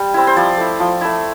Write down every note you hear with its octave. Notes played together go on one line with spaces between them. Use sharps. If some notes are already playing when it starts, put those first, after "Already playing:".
Already playing: G3
C4 E4
C5
F3 D5
A3 E4
F3
A3 E4